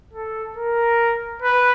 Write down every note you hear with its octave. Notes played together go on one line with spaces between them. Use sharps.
A4
A#4
B4